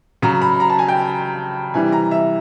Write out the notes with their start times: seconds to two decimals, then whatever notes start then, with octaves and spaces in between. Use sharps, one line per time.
0.22 C#3 F#3 A#5
0.42 B5
0.60 A#5
0.70 A5
0.79 G#5
0.88 G5
1.74 C3 E3 G3 G#5
1.92 A#5
2.11 E5